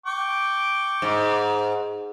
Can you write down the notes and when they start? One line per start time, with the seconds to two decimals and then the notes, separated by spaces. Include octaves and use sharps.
0.06 G5 C#6 D6
1.02 G#2